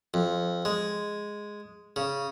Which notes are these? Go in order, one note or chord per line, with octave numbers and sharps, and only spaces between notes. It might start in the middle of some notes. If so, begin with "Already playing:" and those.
F2
G#3
C#3